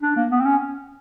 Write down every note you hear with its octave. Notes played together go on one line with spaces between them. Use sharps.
D4
A#3
B3
C4
C#4